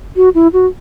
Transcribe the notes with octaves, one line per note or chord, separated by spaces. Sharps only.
F#4
E4
F#4